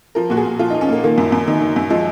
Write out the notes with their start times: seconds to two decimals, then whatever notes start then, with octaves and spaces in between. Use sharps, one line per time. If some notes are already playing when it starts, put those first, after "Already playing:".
0.15 F3 A#4
0.30 A#2 F#4
0.37 G#4
0.45 A#2
0.59 F3 F4
0.70 D#4
0.75 F3
0.81 C#4
0.89 A#2 A#3
1.04 D#3 A#3
1.18 F#2
1.32 F#2
1.48 D#3
1.61 D#3
1.76 F#2
1.90 F3 G#3